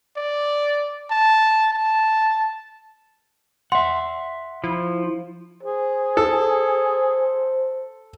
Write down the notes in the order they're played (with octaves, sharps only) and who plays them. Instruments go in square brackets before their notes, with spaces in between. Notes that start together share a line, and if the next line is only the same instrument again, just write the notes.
[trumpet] D5
A5
A5
[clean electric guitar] E5 F#5 [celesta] C6
[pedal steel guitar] F3 [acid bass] E4
[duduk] G#4 [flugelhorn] C5
[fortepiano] A4